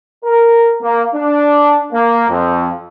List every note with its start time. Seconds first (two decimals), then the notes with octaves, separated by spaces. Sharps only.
0.25 A#4
0.82 A#3
1.15 D4
1.93 A#3
2.29 F2